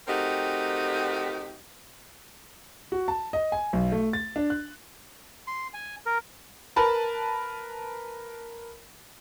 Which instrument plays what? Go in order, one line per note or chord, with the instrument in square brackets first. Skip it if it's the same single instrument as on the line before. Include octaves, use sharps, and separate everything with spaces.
[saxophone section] A3 C4 D#4 F#4 G4 A#4
[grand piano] F#4
A5
D#5
G#5
B1
A3
A6
D4
F#6
[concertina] C6
G#5
A#4
[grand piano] A#4 B4 A5 B5